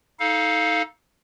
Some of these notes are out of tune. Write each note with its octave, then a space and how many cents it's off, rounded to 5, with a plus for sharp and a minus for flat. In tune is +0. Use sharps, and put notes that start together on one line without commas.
D#4 +25 A4 -10 F5 +0